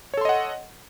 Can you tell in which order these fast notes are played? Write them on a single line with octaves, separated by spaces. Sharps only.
C#5 A4 C6 D#5 F#5